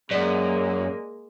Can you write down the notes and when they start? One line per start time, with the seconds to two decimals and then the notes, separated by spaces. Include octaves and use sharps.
0.11 F#2 G#3 A#3 D5